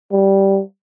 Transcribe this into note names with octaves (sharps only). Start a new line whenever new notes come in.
G3